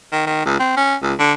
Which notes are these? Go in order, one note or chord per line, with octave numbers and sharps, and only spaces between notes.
D#3
D#3
C#2
C4
C#4
C#2
D3